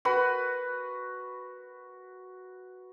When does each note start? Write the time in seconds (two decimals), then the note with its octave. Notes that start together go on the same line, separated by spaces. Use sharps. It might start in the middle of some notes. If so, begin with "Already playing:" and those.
0.05 F#4 B4